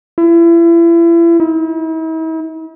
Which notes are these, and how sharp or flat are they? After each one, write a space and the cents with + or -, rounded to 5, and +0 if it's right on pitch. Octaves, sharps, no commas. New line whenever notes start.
E4 +35
E4 -45